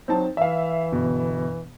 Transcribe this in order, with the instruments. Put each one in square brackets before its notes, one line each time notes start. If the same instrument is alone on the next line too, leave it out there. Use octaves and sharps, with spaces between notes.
[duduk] F#3 [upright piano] C4 D#4 A5
[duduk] E3 [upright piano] E5 F5
[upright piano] G1 B2